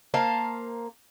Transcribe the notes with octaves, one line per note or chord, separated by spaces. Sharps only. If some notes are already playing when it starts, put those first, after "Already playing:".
A#3 C5 F5 A5